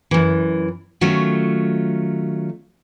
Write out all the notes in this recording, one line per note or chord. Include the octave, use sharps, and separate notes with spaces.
F#2 E3
D#3 F#3 A3 C#4 F4